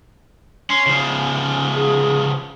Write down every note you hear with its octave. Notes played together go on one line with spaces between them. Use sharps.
C#4 C6
C#3 F3
C#4
G#4